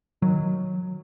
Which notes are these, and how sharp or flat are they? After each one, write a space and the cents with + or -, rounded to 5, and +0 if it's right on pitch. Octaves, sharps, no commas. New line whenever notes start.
D#3 +0 F#3 -10